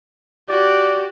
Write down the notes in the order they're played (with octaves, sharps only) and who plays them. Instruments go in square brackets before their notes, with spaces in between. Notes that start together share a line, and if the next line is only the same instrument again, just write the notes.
[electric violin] F#4 G4 [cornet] D5